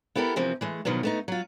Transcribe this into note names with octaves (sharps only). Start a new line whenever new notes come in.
B3 E4 G4 A4 A#4
C3 E3 F3 A#3 C4
E3 G#3 A3
B2 D#3 F3 F#3 B3
A3 B3 D#4
F#3 F4